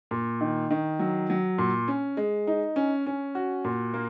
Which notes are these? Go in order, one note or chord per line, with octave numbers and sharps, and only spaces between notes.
A#2
D#3
D#3
F#3
F#3
A#2
C#4
G#3
D#4
C#4
C#4
F#4
A#2
A#3